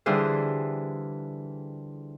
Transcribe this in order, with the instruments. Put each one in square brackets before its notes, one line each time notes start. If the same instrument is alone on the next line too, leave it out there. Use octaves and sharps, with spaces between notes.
[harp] D3 E3 G3 F4 G#4 C5